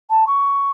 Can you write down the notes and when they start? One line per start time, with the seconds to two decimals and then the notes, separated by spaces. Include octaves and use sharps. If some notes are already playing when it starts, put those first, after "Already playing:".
0.09 A5
0.26 C#6